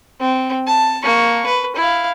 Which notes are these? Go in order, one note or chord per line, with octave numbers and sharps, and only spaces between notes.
C4
A5
A#3 C#6
B4
E4 F5